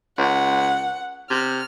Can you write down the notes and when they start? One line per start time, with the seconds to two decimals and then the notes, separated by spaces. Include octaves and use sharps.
0.18 C#2 F#5
1.30 C3 F6